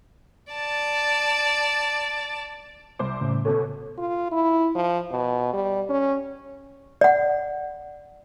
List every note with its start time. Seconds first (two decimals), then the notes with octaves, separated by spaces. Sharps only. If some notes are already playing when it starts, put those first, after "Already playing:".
0.53 D5 A5
2.99 C2 C5 D6
3.21 A2 C#3
3.45 B2 C#4 A4
3.98 F4
4.32 E4
4.75 F3
5.11 B2
5.53 G3
5.90 C#4
7.01 D5 F#5